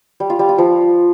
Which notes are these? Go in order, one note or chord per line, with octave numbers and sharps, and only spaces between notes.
G3
F4
G3
F4
F3